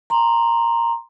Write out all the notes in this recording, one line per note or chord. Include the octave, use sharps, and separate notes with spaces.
A#5 C6